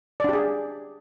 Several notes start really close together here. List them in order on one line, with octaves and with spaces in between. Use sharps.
D5 D4 G4 G#4